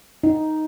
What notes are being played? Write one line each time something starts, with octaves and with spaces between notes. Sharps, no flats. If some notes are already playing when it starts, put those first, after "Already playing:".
D#4